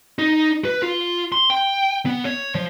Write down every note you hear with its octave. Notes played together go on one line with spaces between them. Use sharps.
D#4
B4
F4
C6
G5
B3
C#5
F3